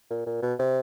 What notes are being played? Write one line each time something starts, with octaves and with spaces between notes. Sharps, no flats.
A#2
A#2
B2
C3